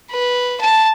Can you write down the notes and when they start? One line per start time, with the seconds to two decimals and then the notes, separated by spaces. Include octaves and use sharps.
0.11 B4
0.61 A5